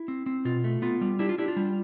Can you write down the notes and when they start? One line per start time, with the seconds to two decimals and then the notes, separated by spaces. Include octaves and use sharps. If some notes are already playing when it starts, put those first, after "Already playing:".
Already playing: E4
0.08 C4
0.26 C4
0.45 B2 F4
0.64 A3
0.82 B3 F4
1.01 G3
1.19 D4 E4 G4
1.29 F4
1.38 D4 E4 G4
1.48 F4
1.57 G3